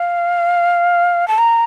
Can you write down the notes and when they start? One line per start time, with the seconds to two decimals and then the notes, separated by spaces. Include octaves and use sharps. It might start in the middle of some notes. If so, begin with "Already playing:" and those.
Already playing: F5
1.28 A5
1.38 A#5